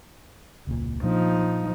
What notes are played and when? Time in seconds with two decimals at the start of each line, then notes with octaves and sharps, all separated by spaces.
0.67 E1 C#2 A#2
1.03 A#2 F3 A#3 D4 D#4